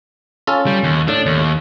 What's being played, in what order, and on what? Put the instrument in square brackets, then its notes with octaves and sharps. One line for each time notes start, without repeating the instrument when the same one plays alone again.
[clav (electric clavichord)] C#4 F4 A4
[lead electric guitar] G3
D#2
[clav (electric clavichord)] A2 [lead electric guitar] D4
[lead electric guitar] D#2